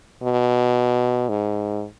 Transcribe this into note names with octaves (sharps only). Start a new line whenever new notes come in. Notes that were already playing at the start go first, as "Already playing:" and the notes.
B2
G#2